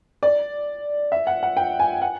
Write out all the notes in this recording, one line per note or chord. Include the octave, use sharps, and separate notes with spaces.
D5
E5
F#5
F#5
G5
G#5
F#5